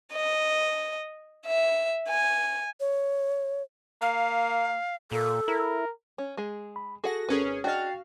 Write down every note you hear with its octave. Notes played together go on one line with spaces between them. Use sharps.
D#5
E5
G#5
C#5
A#3 F5
A#2 A#3 A4
E4 A#4
C#4
G#3 G#4
B5
F#4 G#4 A4 F#5 A#6
G#1 C#4 G#4 A#4 B4
D4 F#4 G#4 D#5 F5 G5 A6